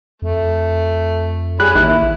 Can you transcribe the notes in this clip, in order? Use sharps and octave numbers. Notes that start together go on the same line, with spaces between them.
F2 A3
G3 C#4 G4 G#4 B5 F#6
A1 D#3 A#3 E4